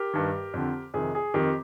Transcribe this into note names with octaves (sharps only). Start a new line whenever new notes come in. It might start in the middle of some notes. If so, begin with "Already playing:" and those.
Already playing: G4 A#4
G2 D#3
F2 D3
F2 C3 D#3 G#4
G#4
F2 D#3 G4